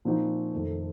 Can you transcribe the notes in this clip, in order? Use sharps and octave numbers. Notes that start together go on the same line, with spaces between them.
A#2 F3 C4 D#4 F#4
F2 D#3 A3 C4